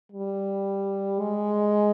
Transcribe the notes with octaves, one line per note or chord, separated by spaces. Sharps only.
G3
G#3